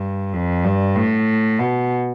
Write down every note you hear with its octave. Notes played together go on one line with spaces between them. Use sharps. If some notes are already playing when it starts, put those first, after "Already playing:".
Already playing: G2
F2
G2
A2
B2